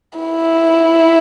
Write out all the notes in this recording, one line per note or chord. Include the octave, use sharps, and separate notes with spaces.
E4